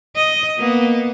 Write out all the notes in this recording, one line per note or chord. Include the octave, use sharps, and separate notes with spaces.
D#5
A#3 B3